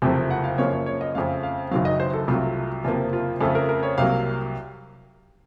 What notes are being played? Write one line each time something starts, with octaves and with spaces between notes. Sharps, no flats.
F#1 F2 C3 F3 A3
F#5
F5
F#2 C#3 F3 A#3 C#5
C#5
C#5
D#5
F2 C#3 A3 F5
F5
F#1 F#2 D#3 F#3 F5
D#5
C5
A4
C2 C3 F#3 A3 F4
F#1 F2 C3 F3 A#3 F4
F4
F2 C#3 A3 A4
A#4
A#4
C#5
C2 C3 F#3 A#3 F5